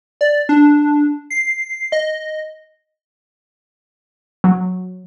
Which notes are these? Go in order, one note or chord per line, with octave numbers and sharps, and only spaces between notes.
D5
D4
C7
D#5
F#3